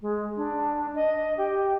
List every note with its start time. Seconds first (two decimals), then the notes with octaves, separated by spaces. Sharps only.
0.01 G#3
0.37 D4
0.95 D#5
1.37 G4